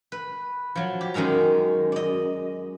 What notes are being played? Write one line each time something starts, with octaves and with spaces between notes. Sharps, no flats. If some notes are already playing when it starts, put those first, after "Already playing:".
B4
F3 F#3
G4
F#2 D#3 G#3 A#4 A#5
D5 D#5